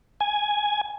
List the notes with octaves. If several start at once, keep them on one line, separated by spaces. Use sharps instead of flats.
G#5